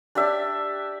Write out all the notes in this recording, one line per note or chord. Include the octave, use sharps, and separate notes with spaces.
D4 G4 D5 E5